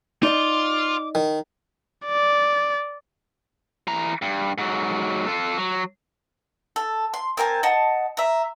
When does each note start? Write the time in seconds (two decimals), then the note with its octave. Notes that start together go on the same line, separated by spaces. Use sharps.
0.23 D#4 F4 D5 D#5 D6
1.15 D#3
2.06 D5
3.87 E3 A#5
4.22 G2
4.58 G#2 F#3
5.26 F4 A4
5.58 F#3
6.76 A4
7.14 C6
7.37 C4 A#4 G#5 A5
7.63 D#5 F#5 A5
8.17 E5 A#5